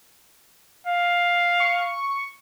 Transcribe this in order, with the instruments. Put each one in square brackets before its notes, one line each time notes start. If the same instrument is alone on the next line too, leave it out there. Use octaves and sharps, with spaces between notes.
[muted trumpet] F5
[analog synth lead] C#6